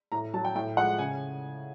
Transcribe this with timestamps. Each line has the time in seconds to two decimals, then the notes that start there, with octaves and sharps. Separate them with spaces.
0.12 A2 A#5
0.34 F#3 A5
0.45 G5
0.55 A2 G5
0.77 F3 G#3 F#5
0.99 C#3 G#5